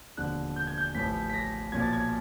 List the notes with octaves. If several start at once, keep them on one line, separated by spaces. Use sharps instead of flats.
E1 D#2 D3 F3 F#6
G6
G#6
G6
A1 A2 F3 B6
B6
A#6
B1 A#2 F3 G#6
A6
G#6